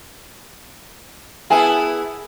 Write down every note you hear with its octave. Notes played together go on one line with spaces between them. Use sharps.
B3 E4 G#4 A#4 G#5 A5